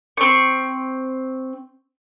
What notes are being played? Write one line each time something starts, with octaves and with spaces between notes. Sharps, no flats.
C4 C#6